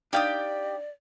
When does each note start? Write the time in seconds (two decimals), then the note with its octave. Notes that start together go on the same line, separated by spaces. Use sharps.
0.13 D4 D#4 G4 D5 F5 G5 D#6